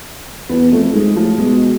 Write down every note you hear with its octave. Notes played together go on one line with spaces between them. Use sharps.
E2 B3
F2 A3
G#2 G#3
A2 F3
B2 G#3